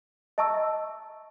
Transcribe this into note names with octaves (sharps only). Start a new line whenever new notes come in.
D#5 E5 A5 A#5 C#6 E6